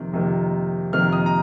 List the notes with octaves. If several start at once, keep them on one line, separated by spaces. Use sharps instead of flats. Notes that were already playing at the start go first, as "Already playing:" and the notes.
Already playing: F2 C3 D#3 A#3
F2 C3 D#3 A#3
F2 C3 D#3 A#3 F6
D#6
A#5